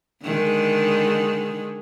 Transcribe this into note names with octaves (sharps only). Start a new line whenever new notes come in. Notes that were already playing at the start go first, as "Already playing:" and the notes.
D3 D#3 G#3